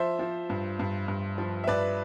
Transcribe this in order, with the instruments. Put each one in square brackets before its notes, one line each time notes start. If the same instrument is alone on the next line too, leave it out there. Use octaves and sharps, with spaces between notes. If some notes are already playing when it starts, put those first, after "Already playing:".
Already playing: [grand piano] F3 C5 E5
F3
G2
G2
G2
F3
E5
G2 B4 D5